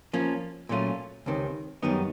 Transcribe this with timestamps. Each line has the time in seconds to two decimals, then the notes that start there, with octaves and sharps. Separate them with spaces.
0.13 F3 A#3 C#4
0.69 A#2 F#3 A3 C#4 F4
1.26 C#2 C3 D#3
1.82 F#2 D#3 G3 B3 D#4